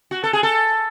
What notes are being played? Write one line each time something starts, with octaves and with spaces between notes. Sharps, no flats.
F#4
A4
G#4
A4